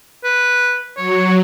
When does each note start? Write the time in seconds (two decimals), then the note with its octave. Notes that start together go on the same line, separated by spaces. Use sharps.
0.24 B4
0.97 F#3 C#5